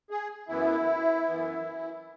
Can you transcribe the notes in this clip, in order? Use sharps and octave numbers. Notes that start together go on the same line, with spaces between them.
G#4
F#2 E3 B3 E4
F#2 E3 B3